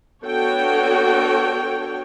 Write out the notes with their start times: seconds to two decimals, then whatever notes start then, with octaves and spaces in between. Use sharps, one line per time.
0.24 B3 D4 F#4 A4 C#5 G5